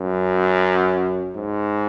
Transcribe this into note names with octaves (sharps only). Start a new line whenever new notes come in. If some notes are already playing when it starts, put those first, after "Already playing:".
Already playing: F#2
G#2